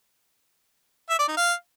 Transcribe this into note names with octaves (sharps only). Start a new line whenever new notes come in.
E5
D5
D#4
F5